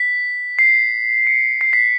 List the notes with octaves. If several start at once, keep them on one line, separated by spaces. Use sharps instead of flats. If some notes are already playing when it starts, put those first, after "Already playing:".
Already playing: B6
C7
C#7
C7
B6